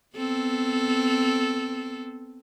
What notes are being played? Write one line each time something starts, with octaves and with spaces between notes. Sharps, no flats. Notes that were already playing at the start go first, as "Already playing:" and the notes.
B3 C4 A4